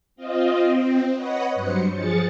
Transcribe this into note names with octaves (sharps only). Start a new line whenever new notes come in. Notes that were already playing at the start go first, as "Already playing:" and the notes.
C4 F4 D#5
C4
B4 C#5 D#5 F#5
G2 F#3 C5 C#7
F3 G#4 A6 C#7